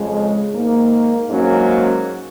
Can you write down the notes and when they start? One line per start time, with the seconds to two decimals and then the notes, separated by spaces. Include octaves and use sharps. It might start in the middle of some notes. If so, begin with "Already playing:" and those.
Already playing: F2 C#3 G#3
0.52 G#2 D#3 A#3 D#4
1.30 G#2 F#3 A#3 C#4